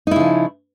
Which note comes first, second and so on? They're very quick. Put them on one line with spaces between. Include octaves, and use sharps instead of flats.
D#4 E4 C#3 F3